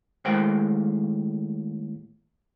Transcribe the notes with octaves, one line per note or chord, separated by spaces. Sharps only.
D#2 A2 G#3 A#3 C5 G5